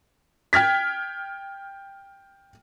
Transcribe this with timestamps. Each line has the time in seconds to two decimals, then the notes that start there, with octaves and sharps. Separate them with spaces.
0.53 G5 F6 G#6 B6